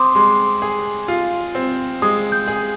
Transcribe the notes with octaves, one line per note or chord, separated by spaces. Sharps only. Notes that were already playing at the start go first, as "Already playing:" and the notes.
Already playing: C4 C6 D6 D#6
G#3 C6
G#4
F4
C4
G#3 D#6
G6
G#4